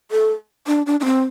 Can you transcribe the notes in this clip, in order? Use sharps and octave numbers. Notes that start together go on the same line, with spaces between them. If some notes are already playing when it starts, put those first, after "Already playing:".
A4
D4
D4
D4
C4